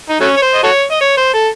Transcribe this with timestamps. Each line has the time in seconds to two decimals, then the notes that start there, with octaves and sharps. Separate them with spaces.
0.09 D#4
0.20 F#3 A3 C#4
0.36 C#5
0.42 C5
0.54 D#5
0.63 F#4 A4 C#5
0.91 D#5
1.01 C#5
1.17 C5
1.34 A4